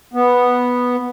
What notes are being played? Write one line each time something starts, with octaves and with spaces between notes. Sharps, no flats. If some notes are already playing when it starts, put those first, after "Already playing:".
B3